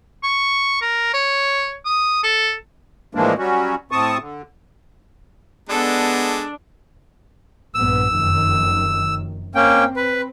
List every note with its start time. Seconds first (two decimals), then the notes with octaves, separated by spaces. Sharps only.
0.23 C#6
0.82 A#4
1.14 C#5
1.86 D#6
2.24 A4
3.15 A2 E3 F3 G#3 A#3 D4
3.38 F#3 G3 C#4 F#4
3.91 A2 C4 A5 C#6 D#6
4.19 D3
5.69 G#3 B3 D4 A4
7.75 A#1 G2 B3 E6
8.16 F1 F#2 D#3
9.55 A#3 C4 C#4 G5
9.96 B4